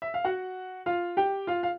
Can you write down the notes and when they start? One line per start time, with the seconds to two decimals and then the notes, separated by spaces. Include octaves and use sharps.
0.02 E5
0.14 F5
0.25 F#4 F#5
0.86 F4 F5
1.17 G4 G5
1.47 F4 F5
1.63 F5